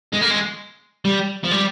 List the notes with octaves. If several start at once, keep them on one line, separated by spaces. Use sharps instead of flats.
G#3
A#3
G#3
G3
F3
G3